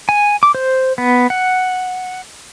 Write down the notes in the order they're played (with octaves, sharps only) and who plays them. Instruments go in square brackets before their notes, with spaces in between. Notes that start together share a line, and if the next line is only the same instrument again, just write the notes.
[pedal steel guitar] G#5
D6
C5
B3
F#5